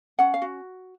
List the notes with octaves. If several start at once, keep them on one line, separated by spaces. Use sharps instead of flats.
C#4 F#5
F5
F#4